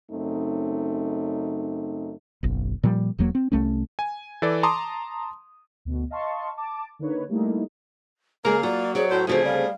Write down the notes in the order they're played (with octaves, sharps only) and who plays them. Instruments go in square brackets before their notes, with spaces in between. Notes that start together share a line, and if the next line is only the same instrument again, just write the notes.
[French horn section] F#2 C#3 A3 C4 D#4
[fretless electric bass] F#1 B1
A#2 F3 G3
E1 E2 F#3 A#3
C4
C2 A3 C#4
[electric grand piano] G#5
E3 A4 D5
A5 A#5 C6 D6 D#6
[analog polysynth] D2 B2
D#5 F5 A5 C6 C#6
A5 D6
D3 A#3 D#4 B4 C#5
G3 A3 A#3 D#4 E4
[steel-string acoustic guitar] C#3 G#4 [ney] G#3 [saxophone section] A#3 [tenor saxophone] A#4
[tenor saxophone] F#3 [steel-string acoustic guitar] F4 [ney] D5
[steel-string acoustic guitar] C4 C#5 D5 [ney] G#4
[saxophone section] A2 C5 [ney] F#4
[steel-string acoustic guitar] D2 C#3 C4 [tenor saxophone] F3 [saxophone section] A3 G#4 [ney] F#4
[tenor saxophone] G3 [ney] F5